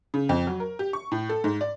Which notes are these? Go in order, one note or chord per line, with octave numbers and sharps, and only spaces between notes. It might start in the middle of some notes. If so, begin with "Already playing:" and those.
C#3
F2
F#3
A#4
G4
C#6
A2
A4
G#2
D5